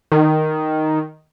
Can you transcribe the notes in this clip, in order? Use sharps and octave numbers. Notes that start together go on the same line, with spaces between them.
D#3